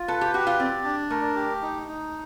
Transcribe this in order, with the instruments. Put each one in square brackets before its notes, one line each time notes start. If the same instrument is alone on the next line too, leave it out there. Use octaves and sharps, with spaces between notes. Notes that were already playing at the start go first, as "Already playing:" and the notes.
Already playing: [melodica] F4
[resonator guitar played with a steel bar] A4 [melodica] B4
[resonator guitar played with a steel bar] G4
[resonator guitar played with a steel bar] F#4 [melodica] G4
[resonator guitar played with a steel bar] F4
[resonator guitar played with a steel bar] C4 [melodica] D5
[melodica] D4
[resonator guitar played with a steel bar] A3 [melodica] A#4
[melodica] G4
D#4
D#4